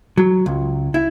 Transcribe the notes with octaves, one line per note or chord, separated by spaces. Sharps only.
F#3
C#2
E4